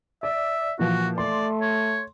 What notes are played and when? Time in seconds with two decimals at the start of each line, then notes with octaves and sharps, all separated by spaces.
0.23 D5 E5
0.79 A#2 E3 F3 F#4
1.18 A3 D5 C6
1.61 C#5